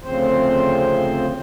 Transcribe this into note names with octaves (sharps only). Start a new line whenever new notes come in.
D2 C#3 F3 C4 C5